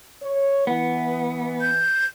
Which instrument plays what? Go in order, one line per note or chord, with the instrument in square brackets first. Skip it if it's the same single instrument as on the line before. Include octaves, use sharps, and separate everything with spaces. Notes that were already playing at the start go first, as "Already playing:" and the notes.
[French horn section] C#5
[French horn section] E3 [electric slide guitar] B3
[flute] G6